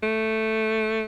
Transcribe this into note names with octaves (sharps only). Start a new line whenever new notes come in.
A3